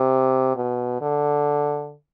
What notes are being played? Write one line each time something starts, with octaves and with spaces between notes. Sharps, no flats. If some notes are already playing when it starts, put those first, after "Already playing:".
Already playing: C3
B2
D3